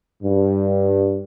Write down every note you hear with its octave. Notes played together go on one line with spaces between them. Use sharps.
G2